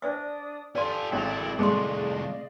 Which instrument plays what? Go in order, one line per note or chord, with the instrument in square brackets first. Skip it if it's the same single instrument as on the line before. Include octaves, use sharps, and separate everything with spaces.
[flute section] D4 D#6 [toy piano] C5 D5 E5
[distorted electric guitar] G4 G#5 [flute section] A4 F5 [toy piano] D5 C6
[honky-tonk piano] G#1 [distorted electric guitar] E4 A#4
[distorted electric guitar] C2 A3 [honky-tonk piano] G#3 [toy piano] G#4 C6 [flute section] D5 D#5 F5